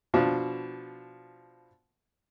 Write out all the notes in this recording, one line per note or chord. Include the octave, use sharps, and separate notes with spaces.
B2 F3 D4